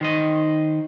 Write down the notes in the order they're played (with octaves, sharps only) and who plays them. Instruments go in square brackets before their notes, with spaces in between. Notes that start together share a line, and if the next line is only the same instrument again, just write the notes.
[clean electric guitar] D#3 C5 D#5